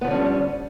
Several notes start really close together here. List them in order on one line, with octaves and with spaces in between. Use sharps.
B3 F3 D3 C#4 G3